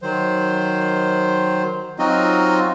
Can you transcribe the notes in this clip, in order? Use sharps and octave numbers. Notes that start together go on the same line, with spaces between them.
D#3 F#3 C5
F#3 C4 D#4 F4 F#4 D#5